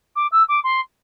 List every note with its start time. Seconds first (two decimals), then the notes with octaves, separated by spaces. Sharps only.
0.15 D6
0.31 E6
0.48 D6
0.63 C6